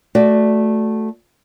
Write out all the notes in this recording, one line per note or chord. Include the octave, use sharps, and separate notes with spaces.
A3 F#4 D5